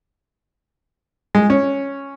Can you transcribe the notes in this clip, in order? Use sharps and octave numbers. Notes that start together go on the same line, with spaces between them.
G#3
C#4